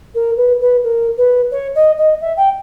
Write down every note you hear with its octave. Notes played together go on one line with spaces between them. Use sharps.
A#4
B4
B4
A#4
B4
C#5
D#5
D#5
E5
G5